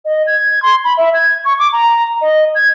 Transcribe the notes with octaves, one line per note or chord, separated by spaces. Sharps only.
D#5
G#6
C6
B5
E5
G#6
C#6
D6
A#5
D#5
G#6